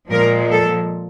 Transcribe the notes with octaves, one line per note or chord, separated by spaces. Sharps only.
A#2 F3 G#3 A#4
A4